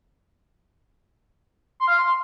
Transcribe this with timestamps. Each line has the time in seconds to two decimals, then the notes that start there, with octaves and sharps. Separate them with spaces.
1.80 C6
1.88 F5
1.95 C6